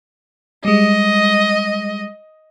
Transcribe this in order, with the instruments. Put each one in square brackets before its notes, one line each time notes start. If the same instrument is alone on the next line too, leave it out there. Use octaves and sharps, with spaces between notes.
[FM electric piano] G3 G#3 [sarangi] D#5